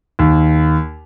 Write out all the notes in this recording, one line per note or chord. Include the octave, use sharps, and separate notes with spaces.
D#2